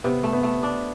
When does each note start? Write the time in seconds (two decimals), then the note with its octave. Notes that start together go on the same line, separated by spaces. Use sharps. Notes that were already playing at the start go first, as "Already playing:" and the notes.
0.04 C3 B3
0.23 A3
0.33 B3
0.43 A3
0.63 D4